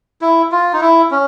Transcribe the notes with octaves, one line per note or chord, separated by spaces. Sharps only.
E4
F4
D#4
E4
C#4